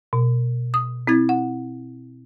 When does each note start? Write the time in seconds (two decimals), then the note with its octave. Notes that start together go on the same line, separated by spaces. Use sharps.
0.13 B2
0.74 D#6
1.07 C4 E4 G#6 A6
1.29 F#5